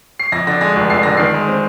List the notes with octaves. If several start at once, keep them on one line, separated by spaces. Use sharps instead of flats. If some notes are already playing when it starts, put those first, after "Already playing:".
C7
F2 A#6
D3 A#6
G#3 A#6
F1
F2 C7
D3 A#6
D#3 C7
G#3
C4